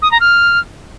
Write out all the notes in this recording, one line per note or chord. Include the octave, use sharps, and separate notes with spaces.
D#6
A#5
F6